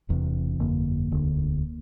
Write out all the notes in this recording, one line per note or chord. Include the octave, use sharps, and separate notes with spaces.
E1 E2 C3
G1 F2 D3 A#3
E1 D2 D3